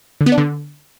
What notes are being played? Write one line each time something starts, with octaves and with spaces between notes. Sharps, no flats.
D3
B3
D4
D3